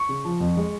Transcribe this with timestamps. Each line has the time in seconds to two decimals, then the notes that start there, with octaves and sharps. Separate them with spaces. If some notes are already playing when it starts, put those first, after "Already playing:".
Already playing: C#6
0.09 C#3
0.25 F3
0.40 F2
0.57 G#3